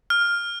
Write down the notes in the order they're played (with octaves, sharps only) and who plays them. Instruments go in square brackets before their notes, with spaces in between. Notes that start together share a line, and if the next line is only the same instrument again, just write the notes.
[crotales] F6